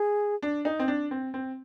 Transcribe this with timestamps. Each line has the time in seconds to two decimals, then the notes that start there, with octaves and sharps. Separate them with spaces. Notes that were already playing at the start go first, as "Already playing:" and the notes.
Already playing: G#4
0.42 D4
0.65 D#4
0.79 C4
0.88 D4
1.11 C4
1.34 C4